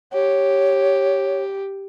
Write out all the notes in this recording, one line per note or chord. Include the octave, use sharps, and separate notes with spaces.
G4 C#5